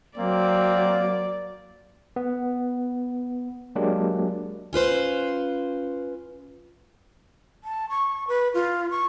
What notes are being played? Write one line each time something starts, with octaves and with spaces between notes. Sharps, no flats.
F#3 A#3 C4 D5
B3
F#3 G#3 A#3 D4 G4
C#4 F4 B4 C5
A5
C#6
B4
F4
C#6